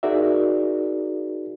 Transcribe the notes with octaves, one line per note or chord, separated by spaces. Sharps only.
D#4 F#4 G#4 A#4 D5 E5